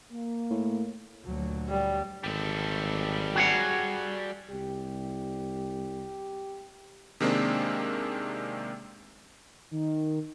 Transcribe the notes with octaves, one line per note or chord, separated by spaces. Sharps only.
A#3
A2
D2 A#2 F#3
G3
G#1 G3 A4
F#4 G#4 F#5
C2 G4
C3 D#3 G#3 A#3 C4 D4
D#3